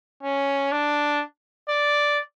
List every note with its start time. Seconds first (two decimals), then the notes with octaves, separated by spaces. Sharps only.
0.23 C#4
0.72 D4
1.69 D5